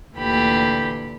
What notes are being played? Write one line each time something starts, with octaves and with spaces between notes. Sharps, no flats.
D2 A#2 D3 E3 G4 B5